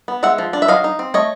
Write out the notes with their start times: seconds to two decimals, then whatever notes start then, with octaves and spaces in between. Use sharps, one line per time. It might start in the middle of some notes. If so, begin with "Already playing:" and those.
0.08 B3
0.23 G#3 E5 F#5
0.38 F3
0.53 D4
0.62 E5
0.68 F#3 D#5 F5
0.84 D#4
0.99 C4
1.14 A3 C#5 D#5